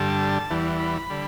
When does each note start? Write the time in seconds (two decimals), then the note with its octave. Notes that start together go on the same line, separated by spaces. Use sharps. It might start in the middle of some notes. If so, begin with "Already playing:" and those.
Already playing: G2 D3 G3 A5
0.51 E2 E3 G3
0.79 B5
1.10 D3 G3